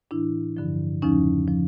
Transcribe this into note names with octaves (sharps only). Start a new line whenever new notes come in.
A2 E3 D4 E4
G2 D3 F3
E2 C#3 F3 C#4 D#4
F3